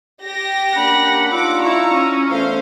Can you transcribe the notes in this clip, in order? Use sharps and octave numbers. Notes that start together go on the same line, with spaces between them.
G4 A#6
A#3 C#4 D4 F#5 B5
D4 D#4 F4 D6 E6
E4 A#5 C#6
C#4
E2 A3 C5 F5